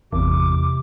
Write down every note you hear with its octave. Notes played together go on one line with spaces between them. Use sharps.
G#1 E2 C3 D6